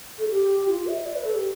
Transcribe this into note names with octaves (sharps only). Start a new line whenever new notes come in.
A4
G4
F4
E5
D5
B4
A4
G4